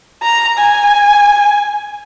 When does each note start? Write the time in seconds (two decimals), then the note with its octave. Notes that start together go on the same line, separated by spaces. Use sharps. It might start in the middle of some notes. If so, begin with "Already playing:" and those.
0.23 A#5
0.58 G#5